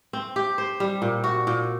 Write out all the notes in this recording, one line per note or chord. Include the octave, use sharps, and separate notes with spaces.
C4
G4
C5
G3
A#2
F#4
A#2